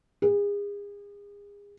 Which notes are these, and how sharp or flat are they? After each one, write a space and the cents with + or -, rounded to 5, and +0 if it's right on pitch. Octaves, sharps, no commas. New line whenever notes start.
G#4 -35